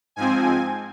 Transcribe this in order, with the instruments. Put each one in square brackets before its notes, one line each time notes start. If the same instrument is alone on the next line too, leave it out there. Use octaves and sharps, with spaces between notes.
[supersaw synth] G#2 F3 C4 G#5